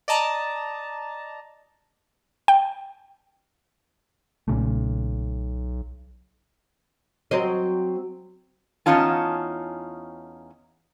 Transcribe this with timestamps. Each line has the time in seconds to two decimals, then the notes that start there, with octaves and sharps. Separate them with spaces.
0.08 D5 D#5 A5 A#5
2.48 G5
4.48 B1 A#2 C#3 A3
7.31 F#3 C4 D#5
8.86 E2 B2 C#4 D#4 F4 A5